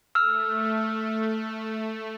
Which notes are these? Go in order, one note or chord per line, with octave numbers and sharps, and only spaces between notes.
A3 E6 F6